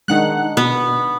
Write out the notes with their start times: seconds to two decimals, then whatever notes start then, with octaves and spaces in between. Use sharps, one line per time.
0.08 D#3 G#3 D4 D#4 F#5 F#6
0.57 B2 B3